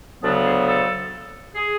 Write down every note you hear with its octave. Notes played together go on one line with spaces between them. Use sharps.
D2 C#3 F#3 B3 D4
G#4
A4
G#4